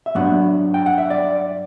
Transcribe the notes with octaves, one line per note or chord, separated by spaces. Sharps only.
E5
G2 F#3 B3 D4 F#5
G5
F#5
E5
D5